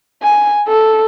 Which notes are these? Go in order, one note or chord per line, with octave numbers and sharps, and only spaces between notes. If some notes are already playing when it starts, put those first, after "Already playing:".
G#5
A4